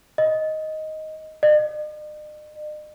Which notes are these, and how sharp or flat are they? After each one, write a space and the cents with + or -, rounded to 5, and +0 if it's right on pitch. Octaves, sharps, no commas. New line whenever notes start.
D#5 +5
D#5 -45